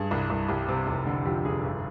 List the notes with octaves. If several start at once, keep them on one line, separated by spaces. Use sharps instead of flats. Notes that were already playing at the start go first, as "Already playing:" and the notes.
Already playing: G2 G#4
C2
C2
C2 G4
C3
F1
D3
F2 G4
F1 G#4
G1